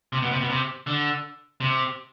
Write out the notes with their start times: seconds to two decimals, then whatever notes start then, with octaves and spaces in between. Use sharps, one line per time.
0.13 C3
0.22 B2
0.32 C3
0.41 B2
0.50 C3
0.87 D3
1.61 C3